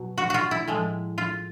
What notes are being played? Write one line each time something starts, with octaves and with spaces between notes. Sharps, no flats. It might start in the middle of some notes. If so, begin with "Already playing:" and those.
Already playing: B2 F#3
F#4
F4 F#4
E4
A2 F3 G#3
F4